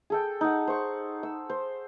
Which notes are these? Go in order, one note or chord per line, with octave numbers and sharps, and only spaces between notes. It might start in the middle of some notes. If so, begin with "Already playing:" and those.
G#4 A4 G5
D#4 F#5
C5 C#6
E6
C5